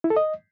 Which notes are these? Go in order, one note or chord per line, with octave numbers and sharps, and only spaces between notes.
E4
A4
D#5